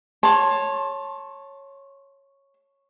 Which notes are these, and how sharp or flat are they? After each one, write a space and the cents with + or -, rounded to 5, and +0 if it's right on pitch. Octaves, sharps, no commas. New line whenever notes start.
C#5 -10 A5 +0 C6 +20